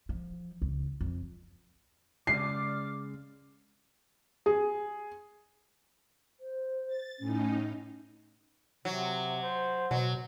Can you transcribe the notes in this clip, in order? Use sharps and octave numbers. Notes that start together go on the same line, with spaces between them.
F3
C#2
F2
C#3 G#3 D5 D6 F6 C7
G#4
C5
A6
A2 C#4 D#4
C3 F#3
C5
B2 F#3